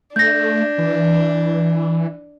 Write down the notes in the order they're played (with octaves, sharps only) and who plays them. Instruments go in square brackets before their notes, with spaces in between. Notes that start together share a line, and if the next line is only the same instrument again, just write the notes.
[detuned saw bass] A3 [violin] D4 [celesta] G6 A#6
[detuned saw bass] E3